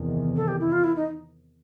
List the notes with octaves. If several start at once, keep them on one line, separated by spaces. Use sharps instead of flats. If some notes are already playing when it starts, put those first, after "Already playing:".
Already playing: E2 C3 D#3
A4
G4
E4
F4
E4
D#4